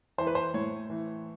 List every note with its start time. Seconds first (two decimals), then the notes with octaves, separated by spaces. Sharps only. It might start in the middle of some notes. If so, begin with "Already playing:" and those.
0.18 E3 C5
0.27 B4
0.35 C5
0.54 A2 C#5
0.90 E3